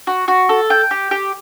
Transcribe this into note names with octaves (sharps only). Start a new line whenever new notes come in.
F#4
F#4
A4
G5
G4
G4